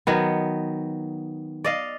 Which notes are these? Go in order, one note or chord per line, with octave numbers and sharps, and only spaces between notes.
D#3 F#3 B3
D5 D#5 F5